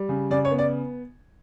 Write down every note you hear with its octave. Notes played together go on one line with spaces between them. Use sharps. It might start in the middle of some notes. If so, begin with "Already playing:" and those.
Already playing: G3
C#3
C#3 D5
C#5
B3
D5